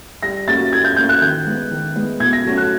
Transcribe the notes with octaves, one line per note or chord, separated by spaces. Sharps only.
G3 A#6
A#3 C#4 F#4 A6
G3 G#6
G6
A#3 C#4 F#4 G6
F#6
D#3 G6
G#3 B3
D#3
G#3 B3
B2 G#6
A#6
F#3 A3 C#4 F#4
F#6